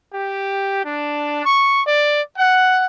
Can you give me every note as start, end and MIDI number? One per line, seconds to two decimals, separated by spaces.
0.13 0.81 67
0.85 1.43 62
1.44 1.82 85
1.85 2.20 74
2.37 2.86 78